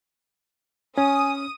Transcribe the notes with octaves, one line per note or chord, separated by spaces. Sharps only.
C#4 G#5 D#6